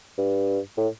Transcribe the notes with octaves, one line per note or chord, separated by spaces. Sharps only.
G2
A2